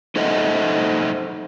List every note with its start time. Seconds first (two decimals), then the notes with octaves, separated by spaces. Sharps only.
0.16 D#4 A4 C5 D#5 E5 F#5